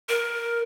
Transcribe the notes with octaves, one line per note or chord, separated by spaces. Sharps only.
A#4